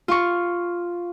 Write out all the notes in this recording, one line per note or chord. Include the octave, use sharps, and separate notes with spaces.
F4 C#6